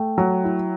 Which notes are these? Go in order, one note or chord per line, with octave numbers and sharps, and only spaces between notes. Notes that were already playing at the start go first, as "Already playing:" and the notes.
Already playing: A3 G5
F#3
E4